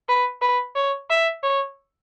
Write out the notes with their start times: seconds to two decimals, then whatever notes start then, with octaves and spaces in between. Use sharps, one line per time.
0.09 B4
0.42 B4
0.76 C#5
1.10 E5
1.43 C#5